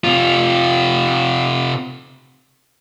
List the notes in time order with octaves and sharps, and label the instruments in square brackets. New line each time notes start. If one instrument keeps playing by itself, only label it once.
[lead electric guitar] C3 F4